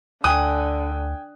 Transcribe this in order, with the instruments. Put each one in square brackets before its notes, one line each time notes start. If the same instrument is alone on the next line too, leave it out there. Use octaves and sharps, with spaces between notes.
[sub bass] D2 [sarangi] D3 [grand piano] G5 G#5 F#6 [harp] D#6